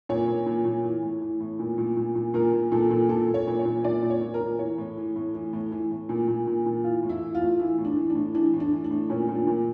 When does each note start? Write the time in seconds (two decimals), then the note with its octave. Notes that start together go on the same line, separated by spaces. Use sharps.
0.09 A#2 C#5
0.28 A#2
0.46 A#2
0.65 A#2
0.84 E3
1.03 A2
1.22 E3
1.41 A2
1.59 A#2
1.78 A#2
1.97 A#2
2.15 A#2
2.34 A#2 A#4
2.53 A#2
2.72 A#2 A4
2.91 A#2
3.09 A#2 A4
3.28 A#2
3.34 C#5
3.47 A#2
3.59 C#5
3.65 A#2
3.84 A#2 D5
4.03 A#2
4.10 C#5
4.22 A#2
4.34 A#4
4.41 A#2
4.59 E3 C#5
4.78 A2
4.97 E3
5.16 A2
5.34 E3
5.53 A2
5.72 E3
5.91 A2
6.09 A#2
6.28 A#2
6.47 A#2
6.66 A#2
6.84 E3 F4
7.03 A2
7.09 E4
7.22 E3
7.35 F4
7.41 A2
7.60 E3 E4
7.78 A2
7.85 D4
7.96 E3
8.10 D4
8.15 A2
8.34 E3 D4
8.54 A2
8.60 D4
8.72 E3
8.84 D4
8.91 A2
9.10 A#2 C#4
9.29 A#2
9.35 D4
9.47 A#2